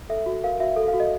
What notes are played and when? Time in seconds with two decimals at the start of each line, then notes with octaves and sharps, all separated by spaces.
0.09 A4 E5
0.26 F#4
0.43 A#4 F5
0.60 F#4 E5
0.76 A4
0.88 F5
0.94 F#4
1.00 D#5